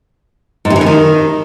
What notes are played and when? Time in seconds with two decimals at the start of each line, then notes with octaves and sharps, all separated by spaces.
0.65 G#2
0.70 C3
0.76 E3
0.81 D3
0.86 D#3